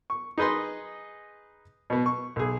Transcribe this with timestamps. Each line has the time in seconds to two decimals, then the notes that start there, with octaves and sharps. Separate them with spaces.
0.10 C#6
0.38 D#4 G#4 B4 D#5 C6
1.90 B2 B3
2.06 C#6
2.36 B1 G#4